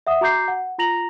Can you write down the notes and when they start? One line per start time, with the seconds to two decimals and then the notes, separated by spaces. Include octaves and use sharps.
0.07 E5 F#5 D#6
0.21 F#4 A#5 D6 G6 C7
0.48 F#5
0.78 F4 A#5 A#6 F7 F#7